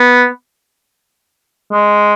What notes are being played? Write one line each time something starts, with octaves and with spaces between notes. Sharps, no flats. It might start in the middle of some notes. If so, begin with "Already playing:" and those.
Already playing: B3
G#3